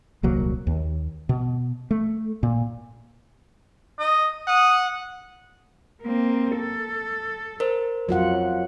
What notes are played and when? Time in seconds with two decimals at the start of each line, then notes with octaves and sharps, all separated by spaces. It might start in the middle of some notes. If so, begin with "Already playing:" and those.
0.23 D#1 C2 F#3 A#3
0.67 D#2
1.29 B2
1.91 A3
2.43 A#2
3.99 D#5
4.48 F#5 D#6
6.02 A#3 C4
6.57 A4
7.60 A#4 C5
8.09 F2 F#3 F4 F#5